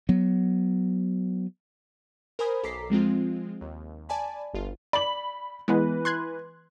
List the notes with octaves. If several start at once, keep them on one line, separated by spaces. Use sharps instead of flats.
F#3 B3
A#4 C5 G#5 B5 D#6 G#6
B1 A4 A#5 D6 B6 C7
F3 G#3 C4 F4
D#2
D5 G#5 A5 B5
G1 F4
D5 B5 F#7
E3 G#3 B3 B4
C6 F#6 G#6